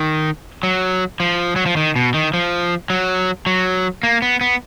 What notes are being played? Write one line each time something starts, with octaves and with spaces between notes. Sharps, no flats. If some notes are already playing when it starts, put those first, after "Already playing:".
Already playing: D#3
F#3
F3
F#3
F3
D#3
B2
D#3
F3
F#3
F#3
A#3
B3
B3